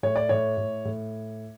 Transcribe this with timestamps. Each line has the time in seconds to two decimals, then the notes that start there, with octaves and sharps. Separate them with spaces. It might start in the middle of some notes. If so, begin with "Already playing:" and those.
0.03 A2 C#5
0.16 D5
0.29 A2 C#5
0.57 A2
0.85 A2